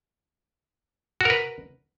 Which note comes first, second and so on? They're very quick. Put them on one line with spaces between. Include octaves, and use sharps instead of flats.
F#4 A#4 B4